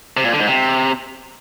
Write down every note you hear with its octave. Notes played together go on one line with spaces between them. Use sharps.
C3
A#2
D3
G#2
C3